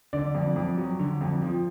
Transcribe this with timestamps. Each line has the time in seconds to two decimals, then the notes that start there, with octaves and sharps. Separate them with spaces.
0.13 D3 D5
0.35 F2
0.56 F2
0.77 F#3
0.99 D3
1.21 F2
1.42 F3